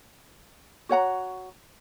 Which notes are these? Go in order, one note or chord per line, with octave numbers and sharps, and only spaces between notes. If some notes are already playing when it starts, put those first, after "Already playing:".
F#4 C#5 F#5 A#5